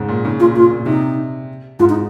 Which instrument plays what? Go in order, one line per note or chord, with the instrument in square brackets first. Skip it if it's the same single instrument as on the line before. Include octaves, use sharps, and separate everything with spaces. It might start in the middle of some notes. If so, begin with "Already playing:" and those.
Already playing: [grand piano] G#2 C#3
A#2
[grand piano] C#3 [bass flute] D#4
[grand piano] A#2 [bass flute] F4
[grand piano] A#2 [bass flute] F4
[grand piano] A#2
[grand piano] C3 [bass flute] D#4
[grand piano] G#2 [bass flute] F4
[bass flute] D#4